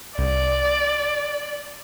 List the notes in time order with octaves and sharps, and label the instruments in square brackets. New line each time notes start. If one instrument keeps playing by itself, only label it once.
[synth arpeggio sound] C2 [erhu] D5